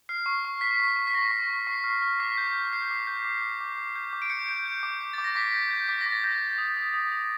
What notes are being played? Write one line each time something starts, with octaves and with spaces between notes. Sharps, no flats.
F6 C7
C#6
C#6
C#6 B6
C#6
C#6
B6
C#6 A#6
C#6
C#6
C#6 C7
F6
F6
D6 B6
G6
G6
G6 C7
D6
G6
D6
D6
D6
D6
G6
D6
D7
G6 C#7
G6
G6
D6
D6
D6 A6
A#6
D6 B6
G6
G6
D6 B6
A#6
D6
A6
G6 A#6
G6
D#6
D#6
D#6
D#6